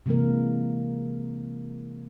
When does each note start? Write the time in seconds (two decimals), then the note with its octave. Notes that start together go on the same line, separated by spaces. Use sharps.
0.06 C3 E3 G#3 A#3 A#4